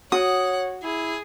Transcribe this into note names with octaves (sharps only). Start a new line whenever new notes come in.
F#4 C#5 F#5 D#6
E4 G#4